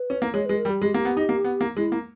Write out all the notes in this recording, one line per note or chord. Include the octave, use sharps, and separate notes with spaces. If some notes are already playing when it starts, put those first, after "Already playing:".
Already playing: B4
C#4
A#3
G#3 C#5
G#3 B4
A#4
G3
G4
G#3
A#3
B3
D#4
A#3
B3
A#3
G#3 E4
A#3